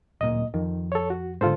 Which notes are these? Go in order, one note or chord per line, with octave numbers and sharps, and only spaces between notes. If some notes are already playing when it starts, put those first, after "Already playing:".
D1 A#2 D#5
F2 D#3
A4 C#5
F#4
G#2 D3 F4 A4 C5